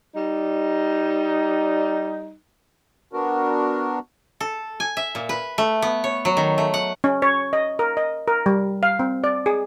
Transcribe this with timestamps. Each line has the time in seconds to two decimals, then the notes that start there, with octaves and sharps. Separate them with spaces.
0.16 G3 D#4
3.13 B3 D4 F#4 A#4
4.40 A4
4.80 G#5
4.97 E5
5.15 A#2
5.29 B4
5.58 A3
5.82 B3
6.04 C#5
6.25 F#3
6.37 D#3
6.58 A3
6.74 F#5
7.04 C#4
7.22 C#5
7.53 D#5
7.79 A#4
7.97 D#5
8.28 A#4
8.46 G3
8.83 F5
8.99 C4
9.24 D5
9.46 G#4